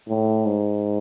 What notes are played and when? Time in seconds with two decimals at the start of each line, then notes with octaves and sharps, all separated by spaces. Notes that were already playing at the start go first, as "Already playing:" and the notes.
0.09 A2
0.46 G#2